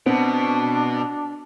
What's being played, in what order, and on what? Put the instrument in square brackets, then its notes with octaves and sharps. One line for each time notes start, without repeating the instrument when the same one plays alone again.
[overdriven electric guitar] B2 [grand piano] B3 [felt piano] C4 [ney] D4